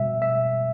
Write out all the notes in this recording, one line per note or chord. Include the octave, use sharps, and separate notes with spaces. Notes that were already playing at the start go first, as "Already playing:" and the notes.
Already playing: B2 G3 E5
E5